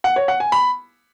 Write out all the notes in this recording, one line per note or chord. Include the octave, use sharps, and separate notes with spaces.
F#5
C#5
F#5
G#5
B5